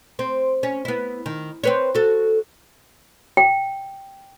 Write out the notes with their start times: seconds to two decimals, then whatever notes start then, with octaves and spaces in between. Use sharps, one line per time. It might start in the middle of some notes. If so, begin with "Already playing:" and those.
0.19 C4
0.63 C#4
0.85 B3 E4
1.26 D#3
1.64 C4 B4 C#5
1.95 F#4 A4
3.37 G5